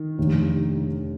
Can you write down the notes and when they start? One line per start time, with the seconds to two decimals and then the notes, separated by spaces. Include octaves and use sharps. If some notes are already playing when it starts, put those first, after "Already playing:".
Already playing: D#3
0.18 F1 D#2 D3